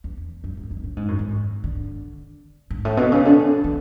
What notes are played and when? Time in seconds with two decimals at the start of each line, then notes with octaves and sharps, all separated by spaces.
0.04 E2
0.44 F#2
0.57 G#2
0.71 F#2
0.84 A2
0.97 G#2
1.08 F#2
1.19 G#2
1.64 D3
2.70 G#2
2.85 A2
2.97 B2
3.12 C#3
3.25 D3
3.64 E3